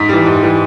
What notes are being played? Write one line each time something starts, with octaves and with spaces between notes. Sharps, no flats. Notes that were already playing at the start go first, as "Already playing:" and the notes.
Already playing: G#2 B6
E3 G3
G#2
E3 G3